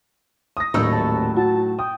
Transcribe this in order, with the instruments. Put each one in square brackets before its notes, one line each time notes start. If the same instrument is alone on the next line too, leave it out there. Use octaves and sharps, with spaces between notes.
[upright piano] D#6 A#6
[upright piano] D#1 A#3 E6 [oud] A2 F#3 D#4
[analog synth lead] A5
[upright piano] F#4 [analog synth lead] A5
[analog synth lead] G5 [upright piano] D#6